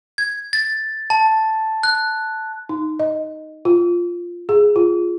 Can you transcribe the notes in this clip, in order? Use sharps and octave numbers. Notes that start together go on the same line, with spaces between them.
G#6
A6
A5
F#6
D#4
D#5
F4
G#4
F4